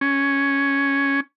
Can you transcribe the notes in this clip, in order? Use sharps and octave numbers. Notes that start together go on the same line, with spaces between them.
C#4